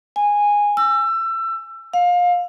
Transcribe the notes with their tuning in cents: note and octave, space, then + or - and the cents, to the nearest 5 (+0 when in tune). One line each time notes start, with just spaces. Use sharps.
G#5 -10
E6 +25
F5 +25